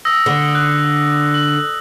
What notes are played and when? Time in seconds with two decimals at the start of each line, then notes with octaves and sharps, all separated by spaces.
0.05 D#6 E6 A#6
0.26 D3
0.55 F#6
1.34 F#7